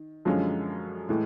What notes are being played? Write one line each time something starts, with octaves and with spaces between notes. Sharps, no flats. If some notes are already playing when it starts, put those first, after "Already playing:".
Already playing: D#3
F#2 D3 F3 G#3 C#4
A2 E3 G#3